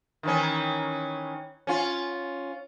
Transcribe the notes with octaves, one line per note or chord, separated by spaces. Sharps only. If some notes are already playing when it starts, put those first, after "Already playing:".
D#3 E3 C#4
C#4 F4